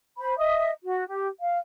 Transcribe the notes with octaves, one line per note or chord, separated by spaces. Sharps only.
C5 B5
D#5 E5 D#6
F#4
G4
F5